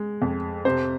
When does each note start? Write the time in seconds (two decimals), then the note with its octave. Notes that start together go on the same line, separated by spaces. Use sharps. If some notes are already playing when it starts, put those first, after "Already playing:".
Already playing: G#3
0.22 F2
0.65 C3 C5